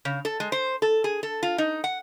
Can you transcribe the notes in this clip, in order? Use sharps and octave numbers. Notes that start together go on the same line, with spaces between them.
C#3
A4
G#3
C5
A4
G#4
A4
F4
D#4
F#5